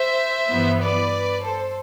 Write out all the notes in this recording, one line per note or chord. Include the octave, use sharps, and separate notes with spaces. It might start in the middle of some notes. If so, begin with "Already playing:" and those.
Already playing: C5 E5
G2 E3 B3
B4 D5
A4 C5